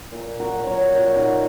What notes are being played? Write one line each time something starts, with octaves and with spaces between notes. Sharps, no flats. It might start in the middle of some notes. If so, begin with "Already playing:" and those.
A#2
F#4 A#4
F#3 A#3
A#4 C#5
A#2 F#4 A#4
D#4 F#4